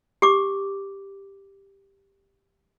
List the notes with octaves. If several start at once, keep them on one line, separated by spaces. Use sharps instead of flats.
G4 D6